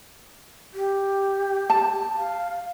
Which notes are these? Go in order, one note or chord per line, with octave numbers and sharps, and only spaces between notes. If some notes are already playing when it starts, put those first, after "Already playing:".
G4
A5
F5